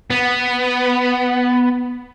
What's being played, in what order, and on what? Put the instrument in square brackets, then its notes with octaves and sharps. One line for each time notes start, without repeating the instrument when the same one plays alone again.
[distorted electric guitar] B3